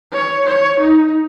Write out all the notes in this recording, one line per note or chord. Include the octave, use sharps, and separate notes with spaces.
C#5
C#5
D#4